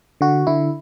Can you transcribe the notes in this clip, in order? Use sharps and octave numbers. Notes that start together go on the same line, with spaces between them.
D3 F#4
D3 E4